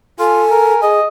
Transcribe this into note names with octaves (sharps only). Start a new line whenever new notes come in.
F4 A4 G#5
A#4
G#4 D#5